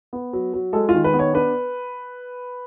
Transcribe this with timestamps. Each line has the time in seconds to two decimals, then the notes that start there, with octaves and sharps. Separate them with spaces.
0.13 B3
0.33 F#3
0.54 F#3
0.73 G#3 A4
0.89 F4
0.94 D#3
1.04 B4
1.14 B3
1.19 C#5
1.34 D4 B4